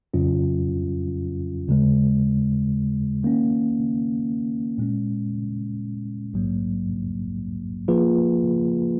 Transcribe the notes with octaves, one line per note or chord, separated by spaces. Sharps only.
F2 C#3 F#3 C#4 F4
D#2 C#3 G#3
D#3 A#3 C#4
A#2 G#3 C#4
A#1 G#2 F#3 A#3
F3 A#3 F4 G#4 B4